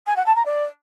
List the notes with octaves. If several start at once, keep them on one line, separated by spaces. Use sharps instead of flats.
G#5
F#5
A5
A#5
D5